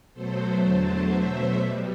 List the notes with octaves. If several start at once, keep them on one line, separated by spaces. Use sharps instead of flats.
B2 F#3 A3 A4 C5
E2 D3 F#3 A3
B2 F#3 A3 C5 E5
B2 G3